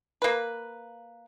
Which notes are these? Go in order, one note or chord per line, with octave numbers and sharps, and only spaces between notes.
A#3 B4